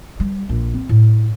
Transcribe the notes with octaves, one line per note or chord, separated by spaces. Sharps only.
G3
A#1
C4
A2